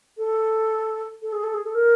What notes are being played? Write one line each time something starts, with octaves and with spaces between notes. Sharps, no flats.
A4
A4
G#4
A4
G#4
A4
A#4